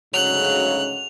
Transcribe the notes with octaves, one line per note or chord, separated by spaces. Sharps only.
D2 G#2 C#3 F#3 F#6 F7